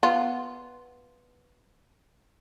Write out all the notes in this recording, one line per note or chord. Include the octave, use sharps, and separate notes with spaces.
B3 F4